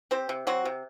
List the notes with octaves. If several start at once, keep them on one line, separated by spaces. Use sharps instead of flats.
C4 G4 C5
C3
F#3 C4 F#4
C3